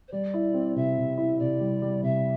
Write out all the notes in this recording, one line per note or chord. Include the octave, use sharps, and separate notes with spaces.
C5
G3 D5
E4
C4
C3 E5
C3
E4
C3 D5
G3
G3
C3 E5